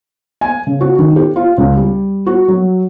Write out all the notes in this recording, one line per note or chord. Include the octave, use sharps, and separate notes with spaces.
G#5
C#3
F#4
D#3
G4
F4
C#2
G3
F#4
F#3